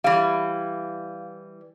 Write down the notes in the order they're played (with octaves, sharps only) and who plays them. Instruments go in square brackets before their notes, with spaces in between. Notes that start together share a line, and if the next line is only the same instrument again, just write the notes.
[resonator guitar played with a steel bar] E3 G3 [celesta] F5